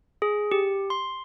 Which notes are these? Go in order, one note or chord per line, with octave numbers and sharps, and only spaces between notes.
G#4
G4
C6